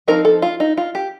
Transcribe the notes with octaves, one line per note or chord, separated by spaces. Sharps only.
F3 C4 D#4 A#4
A4
F4
D#4
F4
G4